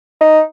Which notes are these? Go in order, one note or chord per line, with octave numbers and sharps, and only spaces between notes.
D#4